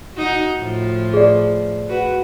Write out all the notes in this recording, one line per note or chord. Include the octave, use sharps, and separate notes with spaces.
D#4 F#4
A2 F3
G#4 D5
F#4 B4